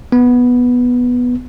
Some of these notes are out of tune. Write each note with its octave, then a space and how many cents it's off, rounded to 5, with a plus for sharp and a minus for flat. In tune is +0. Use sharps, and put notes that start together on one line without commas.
B3 -5